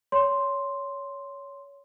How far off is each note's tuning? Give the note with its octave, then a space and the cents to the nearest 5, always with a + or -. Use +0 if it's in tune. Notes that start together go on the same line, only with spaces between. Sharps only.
C#5 +15 C6 +0